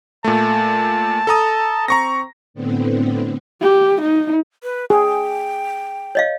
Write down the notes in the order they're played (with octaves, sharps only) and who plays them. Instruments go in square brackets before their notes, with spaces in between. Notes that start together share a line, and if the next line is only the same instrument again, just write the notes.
[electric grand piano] A#2 A3 [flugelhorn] A5
[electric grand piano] A4 A#5 D#6
[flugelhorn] C4 [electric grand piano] A#5 C#6 A#6
[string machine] A2 D3 B3 C4
[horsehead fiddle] G4
D#4
[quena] B4
[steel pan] G#4 [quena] G5
[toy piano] C#5 D#5 F5